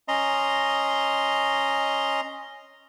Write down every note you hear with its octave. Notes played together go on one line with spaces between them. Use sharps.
C#4 D#5 A#5 C6